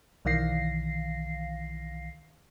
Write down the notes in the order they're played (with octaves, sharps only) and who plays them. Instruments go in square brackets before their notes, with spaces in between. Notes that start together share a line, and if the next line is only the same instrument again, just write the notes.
[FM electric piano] B1 D#3 E3 F5 A#6 C7